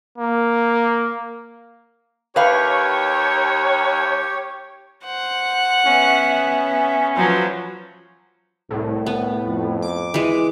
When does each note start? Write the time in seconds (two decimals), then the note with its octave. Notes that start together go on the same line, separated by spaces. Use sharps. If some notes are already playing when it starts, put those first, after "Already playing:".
0.18 A#3
2.36 D#2 G4 B4 C#5 F5
5.04 C5 F#5
5.86 B3 C#4 E5
7.17 F3 F#3 B4 C5
8.70 C2 A2
9.06 B3
9.46 F2
9.82 D6
10.14 E3 G#3 B4